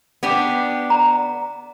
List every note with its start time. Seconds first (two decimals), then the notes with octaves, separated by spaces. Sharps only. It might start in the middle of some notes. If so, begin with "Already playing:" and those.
0.23 B3 D4 G4
0.90 A#5